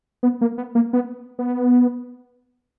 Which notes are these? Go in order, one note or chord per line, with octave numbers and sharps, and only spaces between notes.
B3
A#3
B3
A#3
B3
B3